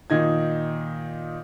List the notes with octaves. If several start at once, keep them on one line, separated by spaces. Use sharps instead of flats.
A#2 D#3 D#4 G#6